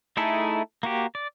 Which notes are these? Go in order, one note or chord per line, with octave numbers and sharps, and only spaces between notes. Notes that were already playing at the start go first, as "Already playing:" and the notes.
A3 D#4 E4 G#4 A4
A#3 F#4 G4
D5